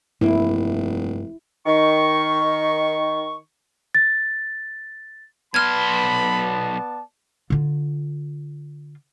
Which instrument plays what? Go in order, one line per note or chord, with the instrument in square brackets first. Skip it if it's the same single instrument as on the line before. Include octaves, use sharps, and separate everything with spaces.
[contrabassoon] F1 [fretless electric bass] G2 A#3 [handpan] E4
[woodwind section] D#3 C#6
[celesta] A6
[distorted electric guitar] B1 C6 [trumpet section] B3 D5 A5 [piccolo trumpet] B5 [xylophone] F6 G#6
[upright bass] D3 F4